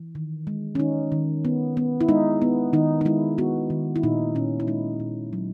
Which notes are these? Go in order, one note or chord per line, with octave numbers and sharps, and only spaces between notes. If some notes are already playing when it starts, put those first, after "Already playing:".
Already playing: E3
D#3
G#3
C#4
D#3 D#4
D#3
B3
B3
E4
G#3 D#4
B3
D#3 D#4
D#4
G#3 E4
B3 F#4
D#3
E4
A#2 D#4
A#2 C#4
E4
G#3 D#4
A#2
F#3